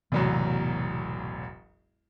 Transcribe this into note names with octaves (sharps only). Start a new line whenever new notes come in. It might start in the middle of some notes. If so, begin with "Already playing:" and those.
E1 A1 C3 E3 F#3 B3